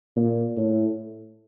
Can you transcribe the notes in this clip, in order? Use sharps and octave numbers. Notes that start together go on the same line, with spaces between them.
A#2
A2